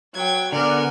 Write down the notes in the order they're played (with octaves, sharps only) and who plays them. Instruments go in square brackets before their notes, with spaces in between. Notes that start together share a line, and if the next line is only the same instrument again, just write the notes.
[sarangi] F#3 [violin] G5 G#6
[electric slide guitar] D3 B3 [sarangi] A#4 [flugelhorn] D5 [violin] G#5 F#6